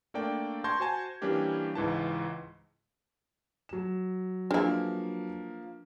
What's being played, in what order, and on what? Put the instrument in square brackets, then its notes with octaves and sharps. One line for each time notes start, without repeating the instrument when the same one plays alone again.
[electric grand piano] A3 A#3 D4 D5 G5
A5 C6 C#6 G6 G#6 A#6
F#4 C5 G#5 A5
E3 G3 A#3 C#4 D4 G4
C#2 G#2 E3 A5
[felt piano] F#3 E7
[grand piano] F3 A#3 [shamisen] G#3 E4 [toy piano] D4 B4